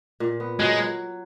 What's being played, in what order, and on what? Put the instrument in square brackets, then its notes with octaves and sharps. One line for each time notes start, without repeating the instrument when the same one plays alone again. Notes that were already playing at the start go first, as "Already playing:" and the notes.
[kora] A#2
B3
[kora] F#3 [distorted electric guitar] G#3